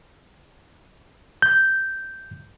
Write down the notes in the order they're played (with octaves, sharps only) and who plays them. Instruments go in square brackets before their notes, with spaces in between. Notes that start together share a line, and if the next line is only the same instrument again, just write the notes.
[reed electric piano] G6